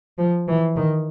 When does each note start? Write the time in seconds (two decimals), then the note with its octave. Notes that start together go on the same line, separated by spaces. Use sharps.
0.18 F3
0.48 E3
0.76 D#3